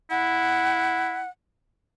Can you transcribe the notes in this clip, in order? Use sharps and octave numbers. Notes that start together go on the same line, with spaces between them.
E4 F#5